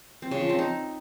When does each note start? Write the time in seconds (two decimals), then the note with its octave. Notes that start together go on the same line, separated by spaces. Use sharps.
0.22 C4
0.31 C#3
0.40 F3
0.50 C4
0.59 D#4